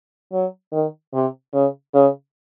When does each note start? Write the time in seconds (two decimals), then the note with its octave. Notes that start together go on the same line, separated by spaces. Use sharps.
0.32 F#3
0.72 D#3
1.13 C3
1.53 C#3
1.94 C#3